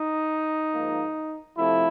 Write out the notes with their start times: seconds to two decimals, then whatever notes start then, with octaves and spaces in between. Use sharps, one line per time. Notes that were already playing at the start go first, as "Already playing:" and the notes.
Already playing: D#4
0.73 G#2 F3 A#3
1.58 F2 C3 F3 A3 C4 E4